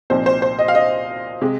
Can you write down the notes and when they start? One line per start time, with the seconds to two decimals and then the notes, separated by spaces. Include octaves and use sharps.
0.10 C2 A#2 F3 C4 D#4 C5
0.26 C5
0.42 C5
0.59 D#5
0.68 F5
0.75 D#5
1.42 C3 G#3